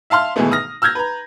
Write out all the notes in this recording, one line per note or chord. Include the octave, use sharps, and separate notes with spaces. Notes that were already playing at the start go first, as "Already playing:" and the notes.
E5 F5 A5 C6 F6
G#1 B2 E3 G#3 A3 B3
D#6 F6 A#6
E6 F6 G6 G#6 A#6
B4 A#5